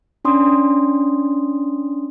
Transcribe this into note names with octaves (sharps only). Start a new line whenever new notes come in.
C#4 D4 C6 D#6